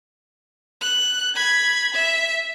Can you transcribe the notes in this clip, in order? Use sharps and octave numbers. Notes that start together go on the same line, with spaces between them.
F#6
B5 G#6
E5